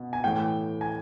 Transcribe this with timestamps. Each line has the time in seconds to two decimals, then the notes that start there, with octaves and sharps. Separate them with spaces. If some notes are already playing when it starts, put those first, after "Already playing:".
Already playing: B2
0.13 G#5
0.24 A2 E3 A3 G5
0.81 G#5